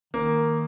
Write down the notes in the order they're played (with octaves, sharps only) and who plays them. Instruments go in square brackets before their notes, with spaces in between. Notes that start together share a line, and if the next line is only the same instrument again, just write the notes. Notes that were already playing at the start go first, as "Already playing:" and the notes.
[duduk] D#3 [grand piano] A#3